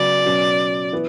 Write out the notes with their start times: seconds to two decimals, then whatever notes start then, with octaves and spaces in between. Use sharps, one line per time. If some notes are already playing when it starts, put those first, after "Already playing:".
Already playing: C#3 F#3 B3 D5
0.25 B2 F#3 C#4
0.92 E3 B3